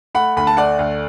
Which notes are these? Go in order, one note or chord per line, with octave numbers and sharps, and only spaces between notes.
A3 F#5 B5
D2 B5
A5
A3 D5 F#5
D2